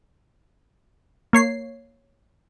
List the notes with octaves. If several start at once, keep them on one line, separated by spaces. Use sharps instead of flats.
A#3 C#5 C7